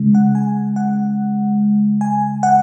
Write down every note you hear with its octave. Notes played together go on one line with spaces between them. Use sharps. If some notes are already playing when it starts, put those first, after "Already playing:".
Already playing: C#3 G#3
F#5
G#5
F#5
G#5
F#5